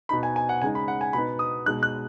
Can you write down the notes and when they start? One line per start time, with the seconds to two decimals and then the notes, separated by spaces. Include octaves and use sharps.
0.09 B2 B3 D#4 B5
0.23 G#5
0.36 G#5
0.49 F#5
0.62 C#3 G#3 D#4 G#5
0.75 B5
0.88 F#5
1.01 G#5
1.13 B2 B3 D#4 B5
1.39 D#6
1.66 B2 G#3 D#4 F#6
1.83 F#6